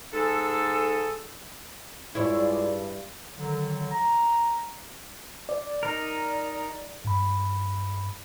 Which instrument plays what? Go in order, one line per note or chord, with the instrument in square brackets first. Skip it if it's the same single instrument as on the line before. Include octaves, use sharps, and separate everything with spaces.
[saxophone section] G#2 G#4 A4
[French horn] G2 [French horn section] G#3 F4 D5 [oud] E4 C#5
[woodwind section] D3 D#3 F#3
A#5
[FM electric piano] D5
[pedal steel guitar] D#4 A#4
[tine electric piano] G2 B5